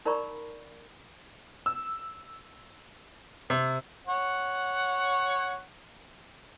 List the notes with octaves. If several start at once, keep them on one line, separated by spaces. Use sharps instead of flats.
D#4 A#4 D5 A#5 B5 C#6
E6
C3
C#5 F#5